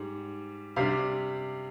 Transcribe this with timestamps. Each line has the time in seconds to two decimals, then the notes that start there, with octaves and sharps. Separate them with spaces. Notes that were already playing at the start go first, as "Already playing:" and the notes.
Already playing: G#2 G3
0.76 C3 G3 D4 F5